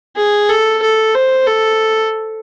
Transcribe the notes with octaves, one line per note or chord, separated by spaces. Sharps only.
G#4
A4
A4
C5
A4